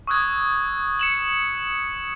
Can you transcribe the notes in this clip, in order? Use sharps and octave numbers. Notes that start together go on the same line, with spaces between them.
C#6 D#6 E6 F#6 G#6
C#7 E7 F#7